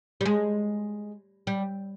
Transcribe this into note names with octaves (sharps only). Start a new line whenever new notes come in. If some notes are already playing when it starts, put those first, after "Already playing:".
G3
G#3
G3